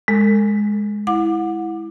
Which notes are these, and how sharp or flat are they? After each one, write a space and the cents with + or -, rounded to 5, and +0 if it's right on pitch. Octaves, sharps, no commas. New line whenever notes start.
G#3 +0 A4 +45
E4 +0 F#5 -20 D6 +20